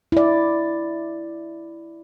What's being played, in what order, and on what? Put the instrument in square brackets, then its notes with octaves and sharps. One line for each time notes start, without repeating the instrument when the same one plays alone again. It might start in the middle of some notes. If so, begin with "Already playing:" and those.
[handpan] E4 D5